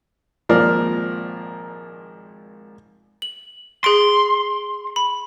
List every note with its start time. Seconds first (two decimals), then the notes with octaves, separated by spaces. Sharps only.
0.49 G#1 A#2 F3 A#4 D5 F5
3.22 F#7
3.84 G#4 C6 D7
4.96 B5